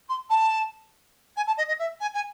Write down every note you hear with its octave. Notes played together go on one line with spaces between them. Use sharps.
C6
A5
G#5
A5
D#5
D#5
E5
G#5
G#5